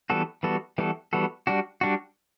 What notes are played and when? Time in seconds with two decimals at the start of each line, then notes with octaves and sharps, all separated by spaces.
0.10 E3 G3 B3 F#4 A4
0.43 E3 G3 B3 F#4 A4
0.78 E3 G3 B3 F#4 A4
1.13 E3 G3 B3 F#4 A4
1.47 G3 D4 F#4
1.81 G3 D4 F#4